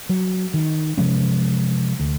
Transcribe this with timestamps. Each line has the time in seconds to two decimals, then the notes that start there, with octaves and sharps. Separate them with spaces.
0.09 F#3
0.54 D#3
0.98 C3 F3 G#3 C#4
2.00 D2